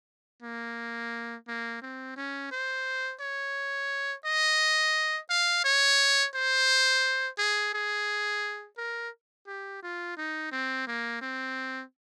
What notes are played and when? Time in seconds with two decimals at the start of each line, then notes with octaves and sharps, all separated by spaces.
0.43 A#3
1.48 A#3
1.82 C4
2.16 C#4
2.52 C5
3.21 C#5
4.26 D#5
5.30 F5
5.64 C#5
6.35 C5
7.38 G#4
7.74 G#4
8.78 A#4
9.47 G4
9.83 F4
10.17 D#4
10.52 C4
10.87 A#3
11.21 C4